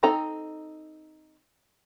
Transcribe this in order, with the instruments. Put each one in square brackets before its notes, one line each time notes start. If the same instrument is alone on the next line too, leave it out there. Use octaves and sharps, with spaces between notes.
[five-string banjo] C4 D#4 A4 A#5